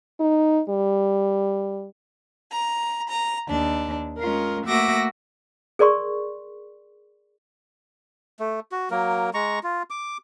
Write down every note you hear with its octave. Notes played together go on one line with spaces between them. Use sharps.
D#4
G3
A#5
A#5
D#2 D4
G#3 C#4 F4 A#4
A3 A#3 F#4 E5 D6 A#6
G#4 A#4 D5 C6 C#6
A3
F#4
F#3 A#3 A#4
G#3 A#5 C#6
F4
D6